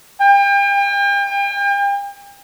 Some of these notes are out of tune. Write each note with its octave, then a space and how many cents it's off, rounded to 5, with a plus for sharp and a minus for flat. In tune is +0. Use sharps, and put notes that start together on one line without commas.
G5 +40